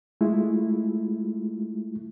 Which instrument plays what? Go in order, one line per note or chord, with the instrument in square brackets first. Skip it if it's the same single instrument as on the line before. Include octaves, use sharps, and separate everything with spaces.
[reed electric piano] G#3 A3 E4 F4